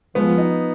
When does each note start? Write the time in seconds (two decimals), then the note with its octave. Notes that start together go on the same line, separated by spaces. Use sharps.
0.15 F3 G#3 B3
0.38 D#4